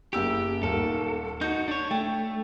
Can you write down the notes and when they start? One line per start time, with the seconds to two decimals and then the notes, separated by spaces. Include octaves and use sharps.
0.13 F#1 G4 E6 D7
0.63 D#1 D#2 A4 A#4
1.41 D#4 F#4 G6
1.68 D4 C#5
1.91 A3 G5